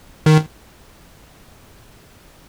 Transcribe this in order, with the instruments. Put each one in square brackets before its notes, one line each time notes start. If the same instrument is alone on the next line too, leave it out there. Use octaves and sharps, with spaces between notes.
[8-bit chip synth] D#3